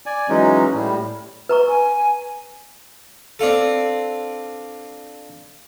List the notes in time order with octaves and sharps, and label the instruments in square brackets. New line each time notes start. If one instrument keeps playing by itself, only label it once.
[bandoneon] D5 G#5
E3 F#3 G#3 C#4 D#4
A2 G3
[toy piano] B4 A#5 C#6
[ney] G#5
[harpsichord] C4 D4 F4 A4